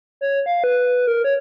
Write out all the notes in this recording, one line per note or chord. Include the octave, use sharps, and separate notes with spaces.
C#5
F5
B4
A#4
C#5